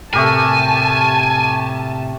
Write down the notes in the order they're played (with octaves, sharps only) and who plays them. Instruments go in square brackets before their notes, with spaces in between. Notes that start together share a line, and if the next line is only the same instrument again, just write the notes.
[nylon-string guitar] A2 C3 [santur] A3 G4 A#4 [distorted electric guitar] G#5 [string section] A5